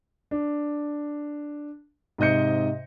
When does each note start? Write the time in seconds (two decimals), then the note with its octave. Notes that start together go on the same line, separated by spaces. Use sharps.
0.31 D4
2.18 G#2 C3 D#5 G6 C#7